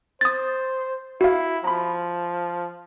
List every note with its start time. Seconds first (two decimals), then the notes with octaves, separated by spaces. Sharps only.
0.21 C5 D#6 A6
1.21 E4 F#4 F5
1.64 F3 A#5 B5